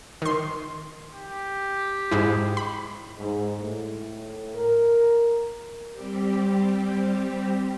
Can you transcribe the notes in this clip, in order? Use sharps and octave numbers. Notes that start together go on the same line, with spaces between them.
D#3 C6
G4
G#2 G#3 E4
B5
G#2
A2
A#4
G3 C4 G4